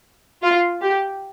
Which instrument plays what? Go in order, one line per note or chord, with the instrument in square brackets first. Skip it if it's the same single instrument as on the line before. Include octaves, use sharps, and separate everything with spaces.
[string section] F4
G4